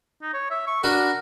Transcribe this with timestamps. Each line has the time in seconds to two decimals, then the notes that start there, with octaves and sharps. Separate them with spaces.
0.22 D#4
0.34 C#5
0.51 E5
0.67 C#6
0.84 D4 F#4 A#4 B4